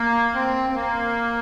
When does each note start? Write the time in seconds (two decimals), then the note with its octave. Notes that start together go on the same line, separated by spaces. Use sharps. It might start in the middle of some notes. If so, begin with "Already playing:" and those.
Already playing: A#3
0.35 C4
0.69 C4
0.75 A#3